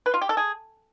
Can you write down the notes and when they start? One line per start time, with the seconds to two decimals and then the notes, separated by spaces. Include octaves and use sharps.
0.06 B4
0.14 F4
0.21 G4
0.29 A4
0.37 G#4